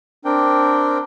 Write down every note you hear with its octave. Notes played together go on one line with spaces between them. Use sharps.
C4 D4 A#4 G5